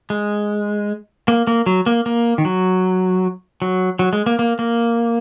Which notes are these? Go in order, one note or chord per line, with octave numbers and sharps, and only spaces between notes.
G#3
A#3
A#3
F#3
A#3
A#3
D#3
F#3
F#3
F#3
G#3
A#3
A#3
A#3